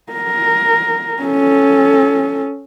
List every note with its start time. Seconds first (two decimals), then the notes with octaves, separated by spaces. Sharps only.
0.12 A#4
1.22 C#4 A4